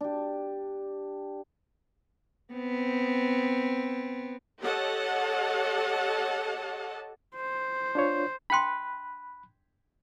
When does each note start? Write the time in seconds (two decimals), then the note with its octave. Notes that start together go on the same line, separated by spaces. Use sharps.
0.01 D4 G4
2.53 B3 C4
4.60 G4 A4 C#5 D#5 F#5 A5
7.37 C5
7.95 D4 F4 C#5
8.50 D4 G5 B5 C6 F#6